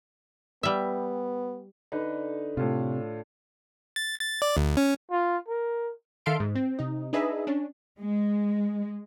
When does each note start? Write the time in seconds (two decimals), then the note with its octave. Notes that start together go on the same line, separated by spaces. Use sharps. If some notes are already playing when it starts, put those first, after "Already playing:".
0.63 G3 B3 E5
1.92 D3 D#4 B4
2.57 A2 C3 F4
3.96 A6
4.20 A6
4.42 D5
4.57 D2
4.77 C#4
5.11 F4
5.48 A#4
6.26 D#3 A4 E5 F5 C6 D7
6.40 G#2
6.55 C4
6.79 C3 D#4
7.13 D4 D#4 G#4 B4 D#5 E5
7.47 C#4 D4
7.99 G#3